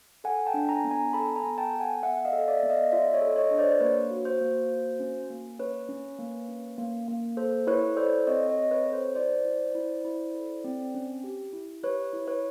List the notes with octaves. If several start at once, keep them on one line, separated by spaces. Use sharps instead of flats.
A4 F#5 G#5
G5 A5
D4
G#5 A#5
B3
G#5 A#5
A4 A5 B5
G#5 A#5
B3
G5 A5
A4
F#5 G#5
B3 E5 F#5
D#5 F5
A4
D5 E5
B3
D#5 F5
F4 D5 E5
C#5 D#5
A4
C#5 D#5
D4
C5 D5
A#3 B4 C#5
F#4
C5
A#3
F#4
C#4
A#3
C#4 B4 C#5
C#4
A#3
C#4
A#3
A#3
A4 C5
E4 B4 C#5
A4 C5 D5
C4 C#5 D#5
C#5 D#5
C4
B4 C#5
A4
C5
E4 C5 D5
E4
E4
E4
A4
C4
C#4
G4
E4
G4 B4 C#5
E4
B4 C#5